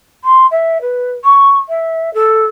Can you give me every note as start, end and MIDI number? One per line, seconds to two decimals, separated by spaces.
0.24 0.46 84
0.51 0.81 76
0.81 1.12 71
1.24 1.54 85
1.69 2.13 76
2.14 2.46 69